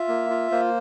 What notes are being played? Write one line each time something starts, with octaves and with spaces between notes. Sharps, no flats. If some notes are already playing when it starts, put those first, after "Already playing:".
Already playing: F4 E5
A#3
F4
A#3 C5